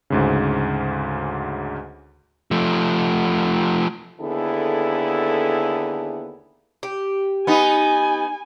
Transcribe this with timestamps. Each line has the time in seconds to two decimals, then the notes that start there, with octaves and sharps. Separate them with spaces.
0.10 D2 G#2 C#3
2.51 F3 A3
4.21 D#2 D3 B3 E4 G#4 A4
6.83 G4
7.47 B3 D#4 G#5